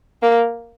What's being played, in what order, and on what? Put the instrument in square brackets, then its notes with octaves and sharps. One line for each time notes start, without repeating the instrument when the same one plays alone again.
[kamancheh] A#3